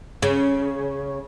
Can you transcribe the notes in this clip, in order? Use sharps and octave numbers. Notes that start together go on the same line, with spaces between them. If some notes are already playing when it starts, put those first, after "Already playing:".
C#3